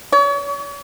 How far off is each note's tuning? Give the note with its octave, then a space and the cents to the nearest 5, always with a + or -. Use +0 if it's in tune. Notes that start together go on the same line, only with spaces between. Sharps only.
C#5 +40